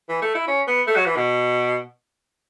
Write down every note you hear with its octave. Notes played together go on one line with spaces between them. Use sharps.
E3
A3
E4
C#4
B3
A3
F#3
E3
B2